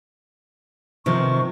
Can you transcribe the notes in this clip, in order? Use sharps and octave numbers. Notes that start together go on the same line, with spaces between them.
C3 D#3 F3 C#6